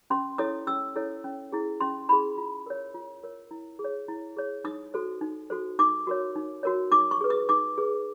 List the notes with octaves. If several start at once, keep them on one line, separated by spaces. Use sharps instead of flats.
C#4 C6
E4 A4 C#5 D#6
C#4 E6
E4 A4 C#5
C#4
E4 G#4
C#4 C6
E4 G#4 B5
F4
A#4 C#5
F4
A#4 C#5
E4
G#4
C#5
E4
G#4 C#5
D#4 D#6
F#4 A4 C5
D#4
F#4 A4 C5
D#4 D6
F#4 A#4 C#5
D#4
F#4 A#4 C#5
D#4 D6
C#6
G#4 B4
D#6
D#4 D6
G#4 B4